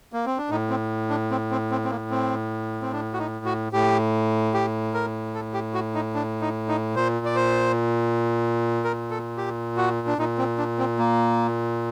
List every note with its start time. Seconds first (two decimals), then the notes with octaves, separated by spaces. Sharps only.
0.13 A#3
0.26 C4
0.38 D4
0.50 A2 D#4
0.70 C4
1.10 D4
1.31 C4
1.51 C4
1.71 C4
1.84 C4
1.91 A#3
2.11 C4
2.82 C4
2.93 D4
3.13 F#4
3.19 D#4
3.45 F#4
3.72 A2 G4
4.54 G4
4.94 A#4
5.35 A4
5.54 G4
5.74 F#4
5.95 D#4
6.15 D4
6.41 D#4
6.69 D#4
6.95 A#2 C5
7.25 D5
7.36 C5
8.84 A#4
9.10 A4
9.38 G4
9.77 F#4
10.07 D4
10.18 A#2 D#4
10.38 C4
10.58 D4
10.79 C4
10.99 A#3